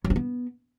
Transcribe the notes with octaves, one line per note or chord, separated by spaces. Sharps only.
F#3
C4
B3